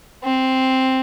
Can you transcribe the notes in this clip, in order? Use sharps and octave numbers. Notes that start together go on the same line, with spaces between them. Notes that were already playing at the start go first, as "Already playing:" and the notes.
C4